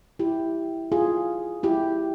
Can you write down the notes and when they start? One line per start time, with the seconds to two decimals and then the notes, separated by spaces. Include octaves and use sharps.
0.19 E4 G4
0.92 F4 G#4
1.63 E4 G4